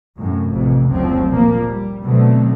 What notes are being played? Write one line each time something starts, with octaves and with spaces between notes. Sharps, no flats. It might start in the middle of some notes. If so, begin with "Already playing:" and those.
F#2 A2 C3
A1 F2 C3
F#1 D2 F3 F#3 C4
A#2 F3 A#3
G3
B2 D3 F#3 A3 C4